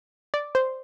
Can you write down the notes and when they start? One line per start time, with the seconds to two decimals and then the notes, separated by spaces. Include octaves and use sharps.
0.34 D5
0.55 C5